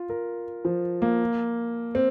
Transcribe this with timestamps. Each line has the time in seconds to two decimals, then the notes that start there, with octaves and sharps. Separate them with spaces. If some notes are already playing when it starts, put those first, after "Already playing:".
Already playing: F4
0.10 A#4
0.65 F3
1.02 A#3
1.95 C4